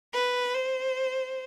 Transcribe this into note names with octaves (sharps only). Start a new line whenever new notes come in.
B4
C5